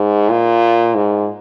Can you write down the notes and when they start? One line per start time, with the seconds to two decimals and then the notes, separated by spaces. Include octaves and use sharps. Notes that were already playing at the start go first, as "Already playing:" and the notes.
Already playing: G#2
0.29 A#2
0.95 G#2